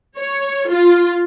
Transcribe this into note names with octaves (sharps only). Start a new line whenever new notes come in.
C#5
F4